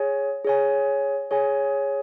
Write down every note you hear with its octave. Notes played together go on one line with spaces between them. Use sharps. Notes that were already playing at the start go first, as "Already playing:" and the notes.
Already playing: G#4 C#5 G#5
G#4 C#5 G#5
G#4 C#5 G#5